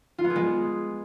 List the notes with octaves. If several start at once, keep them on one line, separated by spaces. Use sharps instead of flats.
F4
B3
G#4
G#3